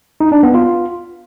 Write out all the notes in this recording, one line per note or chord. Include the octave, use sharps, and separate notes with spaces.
D#4
D4
B3
F4